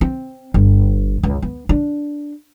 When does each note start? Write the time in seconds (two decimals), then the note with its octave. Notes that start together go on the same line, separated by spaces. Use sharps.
0.01 C4
0.54 G1
1.23 C#2
1.42 B3
1.69 D4